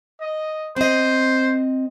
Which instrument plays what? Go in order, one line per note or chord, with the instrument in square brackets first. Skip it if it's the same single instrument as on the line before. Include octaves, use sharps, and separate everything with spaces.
[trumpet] D#5
[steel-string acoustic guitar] C4 D#5 [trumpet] C5